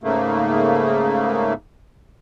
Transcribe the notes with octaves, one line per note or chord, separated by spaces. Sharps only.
G#2 C#3 A3 A#3